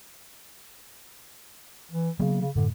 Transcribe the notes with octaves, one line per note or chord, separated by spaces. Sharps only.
E3
C#3 F#3 A#3 B3
C#3
F#2 A2 D3